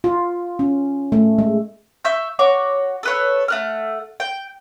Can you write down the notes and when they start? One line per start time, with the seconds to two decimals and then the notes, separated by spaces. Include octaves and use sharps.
0.04 F4
0.59 C#4
1.12 A3
1.38 G#3
2.05 E5 C#6 G6
2.39 F#4 C#5 C#6 D6
3.03 A4 B4 C#5
3.48 A3 F#5 F6
4.20 G5